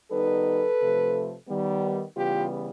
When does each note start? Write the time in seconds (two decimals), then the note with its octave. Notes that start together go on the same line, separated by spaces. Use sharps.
0.10 D#3 G3 B3 D#4 A4 B4
0.80 C3 F3 A3
1.48 D#3 G3 B3
2.16 C#3 E3 G3 B3 F4 G4